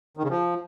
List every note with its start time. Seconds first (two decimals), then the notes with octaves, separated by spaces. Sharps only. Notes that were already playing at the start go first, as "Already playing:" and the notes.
0.17 D#3
0.23 C#3
0.29 F3